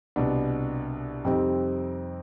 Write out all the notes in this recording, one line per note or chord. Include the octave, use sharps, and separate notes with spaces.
C2 B2 B3 D4
F2 C3 G3 C4 D#4